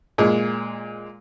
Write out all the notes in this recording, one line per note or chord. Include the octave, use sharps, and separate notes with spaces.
A#2 G#3